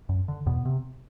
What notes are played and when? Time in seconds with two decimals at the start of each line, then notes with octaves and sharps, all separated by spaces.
0.09 F#2
0.28 D3
0.46 E2 B2 B3
0.65 C3